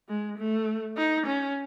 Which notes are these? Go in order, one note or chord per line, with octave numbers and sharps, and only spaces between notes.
G#3
A3
D#4
C#4